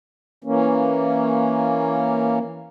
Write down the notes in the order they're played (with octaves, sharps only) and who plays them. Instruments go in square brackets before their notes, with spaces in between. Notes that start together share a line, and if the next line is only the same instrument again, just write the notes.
[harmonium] E3 A#3 C#4